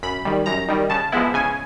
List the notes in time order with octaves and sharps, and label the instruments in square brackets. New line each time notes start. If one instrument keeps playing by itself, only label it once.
[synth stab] F#2 B5
D#3 G3
F#2 A#5
D#3 G3
C#3 A5
F3 G#3 B3 E4
C#3 G#5